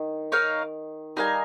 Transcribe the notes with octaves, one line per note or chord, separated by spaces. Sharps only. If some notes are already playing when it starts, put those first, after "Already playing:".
Already playing: D#3
D#4 A#4 C#5 F5
G3 D#4 A#4 F5 G#5